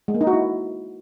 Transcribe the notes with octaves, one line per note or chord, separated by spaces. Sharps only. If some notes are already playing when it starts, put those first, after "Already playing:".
G#3
A#3
D#4
F#4
E4